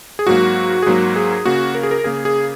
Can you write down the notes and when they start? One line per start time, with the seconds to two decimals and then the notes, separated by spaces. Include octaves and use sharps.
0.19 G#4
0.27 G#2 F#3 A#3 F#4
0.83 G#4
0.86 G#2 F#3 A#3 F#4
1.16 G#4
1.45 C#3 A#3 F#4
1.75 A#4
1.83 G#4
1.91 A#4
2.04 C#3 A#3 G#4
2.25 G#4